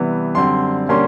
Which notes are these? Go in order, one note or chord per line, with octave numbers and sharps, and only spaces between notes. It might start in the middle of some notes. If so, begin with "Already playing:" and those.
Already playing: C3 E3 G3 B3
F#2 D3 G3 C4 C6
D3 G3 A#3 C#4 C6